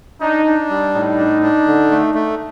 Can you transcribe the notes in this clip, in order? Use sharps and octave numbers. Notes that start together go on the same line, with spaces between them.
D4 D#4
D4
G3
A2 D#4
D4
D4
D3
A3
A3